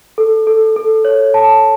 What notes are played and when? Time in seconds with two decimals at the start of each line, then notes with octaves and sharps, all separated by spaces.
0.18 A4
0.47 A4
0.76 A4
1.05 C#5
1.34 A5